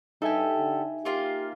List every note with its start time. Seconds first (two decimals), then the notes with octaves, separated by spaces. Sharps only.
0.22 G2 D#4 G4 A4 E5 G#5
0.57 D3
1.05 A#3 F4 G4 F5